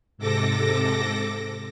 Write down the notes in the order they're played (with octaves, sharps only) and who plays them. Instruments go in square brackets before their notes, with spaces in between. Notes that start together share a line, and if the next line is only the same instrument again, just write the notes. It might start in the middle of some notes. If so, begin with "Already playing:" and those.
[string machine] G#2 C3 A4 D6 A#6